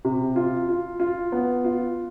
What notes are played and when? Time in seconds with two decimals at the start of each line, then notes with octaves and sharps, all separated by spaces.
0.05 C3
0.36 F4
0.69 F4
1.00 F4
1.32 B3
1.64 F4